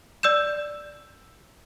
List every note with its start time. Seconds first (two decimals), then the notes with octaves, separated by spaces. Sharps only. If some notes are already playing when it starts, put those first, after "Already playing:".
0.23 D5 E6 G6 E7